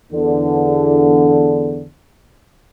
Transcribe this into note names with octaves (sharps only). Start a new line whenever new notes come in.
E2 D3